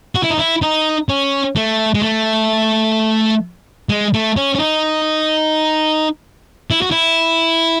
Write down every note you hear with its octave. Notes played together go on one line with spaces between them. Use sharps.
F#4
E4
D#4
E4
D#4
C#4
A3
G#3
A3
G#3
A3
C#4
C#4
D#4
E4
F#4
E4